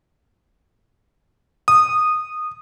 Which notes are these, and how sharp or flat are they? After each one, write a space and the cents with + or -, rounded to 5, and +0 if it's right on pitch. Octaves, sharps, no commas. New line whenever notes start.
D#6 -15